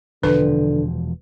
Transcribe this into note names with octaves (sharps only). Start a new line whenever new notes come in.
E1 D3 F3 B4